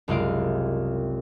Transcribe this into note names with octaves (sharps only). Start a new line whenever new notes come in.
F#1 C2 G#3 F4 F5 D7